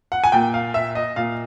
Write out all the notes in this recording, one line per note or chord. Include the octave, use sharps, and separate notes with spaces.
F#5
G#5
A#2 G5
F5
E5
D#5
A#2 F5